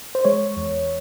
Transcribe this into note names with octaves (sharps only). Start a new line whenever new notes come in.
C5
G#3 C#5
E2